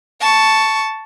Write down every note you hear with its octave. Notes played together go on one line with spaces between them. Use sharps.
A5 C#6